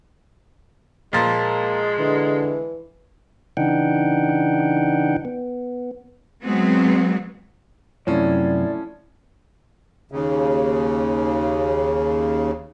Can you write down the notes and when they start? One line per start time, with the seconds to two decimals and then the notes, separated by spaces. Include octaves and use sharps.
1.13 A#2 F3 G#3 A#3
1.99 D3 E3
3.57 C#3 E3 D4 D#4 F#5 G5
5.25 B3
6.44 F#3 G#3 B3 C4
8.07 F#2 C3 F3 A3 C#4 E4 C#5 D5
10.12 D#2 C#3